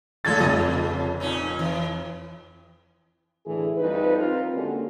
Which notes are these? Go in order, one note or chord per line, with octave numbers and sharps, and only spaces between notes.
A#1 A#2 C#3 A4 G#6 A6
F1 F2 C#3 D#5
A#2 C#4 D#4
E3
A2 D3 E3 G#4
F2 G3 D#4 B4
C4 F4 A#4
D3 G#3 A#3 C#4 F#4 G4